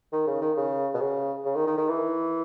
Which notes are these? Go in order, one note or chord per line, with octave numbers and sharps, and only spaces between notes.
D#3
C#3
D#3
C#3
B2
C#3
C#3
D#3
D#3
D#3
E3